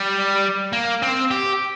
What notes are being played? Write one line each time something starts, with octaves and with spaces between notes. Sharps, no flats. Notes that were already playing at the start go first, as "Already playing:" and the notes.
Already playing: G3
A#3
C4
G4